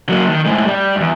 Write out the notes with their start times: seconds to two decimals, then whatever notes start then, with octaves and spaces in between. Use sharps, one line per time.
0.09 F#3 A#3
0.29 D#3
0.46 A2 G#3
0.66 G3
0.96 E2 G2